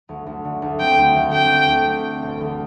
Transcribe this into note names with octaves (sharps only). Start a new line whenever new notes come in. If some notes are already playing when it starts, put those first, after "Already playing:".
D2
D2
D3
D2
C4 G5
D2
D2
C4 G5
C4
D2
C4
C4
E1
D2